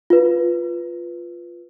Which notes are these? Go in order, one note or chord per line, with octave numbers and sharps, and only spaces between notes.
F4 B4